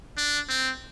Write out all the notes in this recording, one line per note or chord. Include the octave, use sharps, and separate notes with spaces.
D4
C4